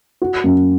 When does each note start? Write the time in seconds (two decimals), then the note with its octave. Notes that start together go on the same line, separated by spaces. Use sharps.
0.22 F#4
0.44 F#2